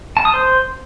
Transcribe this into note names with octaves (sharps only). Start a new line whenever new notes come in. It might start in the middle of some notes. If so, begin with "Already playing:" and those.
A5
D#6
C5